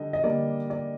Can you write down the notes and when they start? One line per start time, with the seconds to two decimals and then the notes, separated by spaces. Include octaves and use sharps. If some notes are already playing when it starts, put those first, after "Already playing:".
Already playing: D3 G3 D#5
0.13 D#5
0.23 D3 G3 A#3 D5
0.70 D5